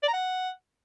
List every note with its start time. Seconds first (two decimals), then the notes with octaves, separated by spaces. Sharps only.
0.03 D5
0.08 A#5
0.13 F#5